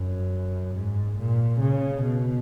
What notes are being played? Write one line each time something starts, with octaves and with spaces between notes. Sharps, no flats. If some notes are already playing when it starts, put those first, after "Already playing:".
Already playing: F#2
G#2
A#2
C#3
B2